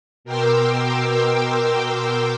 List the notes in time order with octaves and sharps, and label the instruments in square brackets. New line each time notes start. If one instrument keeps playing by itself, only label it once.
[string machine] B2 A#4 G5 C6 D6 E6